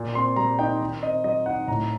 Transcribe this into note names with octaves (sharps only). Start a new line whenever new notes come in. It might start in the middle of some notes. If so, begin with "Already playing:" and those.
Already playing: A#2
C4 C6
G3 A#5
D#4 G5
D#3
C4 D#5
F#3 D#5
D#4 F#5
A2 A#5